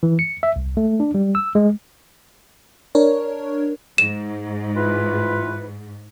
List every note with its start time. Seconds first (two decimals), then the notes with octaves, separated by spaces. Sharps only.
0.03 E3
0.19 C#7
0.43 E5
0.56 C2
0.77 A3
1.00 D4
1.14 G3
1.35 E6
1.55 G#3
2.95 D4 A#4 C#5
3.98 G#2 E7
4.76 E3 F4 B4